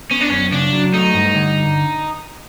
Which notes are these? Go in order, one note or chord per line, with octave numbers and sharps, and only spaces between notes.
B3 C#4
D4
F#2 C#4
C#3 D4
F#3
A3 D#4
G2
D3